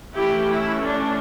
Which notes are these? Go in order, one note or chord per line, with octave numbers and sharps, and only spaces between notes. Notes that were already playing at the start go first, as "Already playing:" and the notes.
E3 A3 C#4 E4 G4
E4
D4